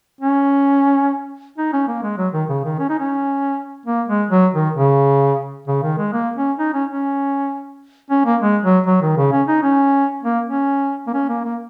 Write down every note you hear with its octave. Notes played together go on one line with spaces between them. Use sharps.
C#4
D#4
C#4
A#3
G#3
F#3
D#3
C#3
D#3
C#4
D#4
C#4
A#3
G#3
F#3
D#3
C#3
C#3
D#3
G#3
A#3
C#4
D#4
C#4
C#4
C#4
A#3
G#3
F#3
F#3
D#3
C#3
C#4
D#4
C#4
A#3
C#4
A#3
C#4
A#3
A#3